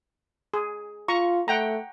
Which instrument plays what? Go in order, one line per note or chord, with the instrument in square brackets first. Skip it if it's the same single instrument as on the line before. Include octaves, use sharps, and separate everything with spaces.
[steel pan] G#4
[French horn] F4 [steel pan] A#5 C#6
[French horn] A3 [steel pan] F#5 G5 A#5